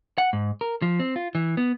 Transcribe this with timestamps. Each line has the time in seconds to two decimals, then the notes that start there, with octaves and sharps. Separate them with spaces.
0.18 F#5
0.33 G#2
0.61 A#4
0.82 F3
0.99 C4
1.16 F4
1.35 E3
1.57 B3